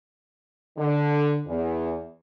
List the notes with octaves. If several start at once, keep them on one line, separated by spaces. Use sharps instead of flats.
D3
E2